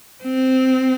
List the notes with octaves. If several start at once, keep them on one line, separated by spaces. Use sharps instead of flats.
C4